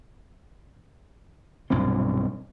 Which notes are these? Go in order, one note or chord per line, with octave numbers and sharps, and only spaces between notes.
B1 G2 A#2 C4